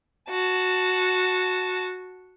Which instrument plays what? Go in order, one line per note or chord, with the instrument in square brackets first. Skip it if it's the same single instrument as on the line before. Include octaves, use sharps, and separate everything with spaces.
[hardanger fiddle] F#4 A5